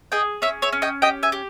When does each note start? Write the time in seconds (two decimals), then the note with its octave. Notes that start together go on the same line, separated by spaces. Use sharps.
0.12 G#4 D#5 G5
0.42 C#4 C#5 E5
0.62 C#5 E5
0.73 C#4
0.82 D#5 G5
1.02 G4 D#5 G5
1.23 E5 G#5
1.32 G4